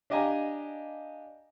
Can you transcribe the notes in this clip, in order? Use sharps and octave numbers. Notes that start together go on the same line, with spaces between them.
D4 G4 D#5 F5 G#5 A#5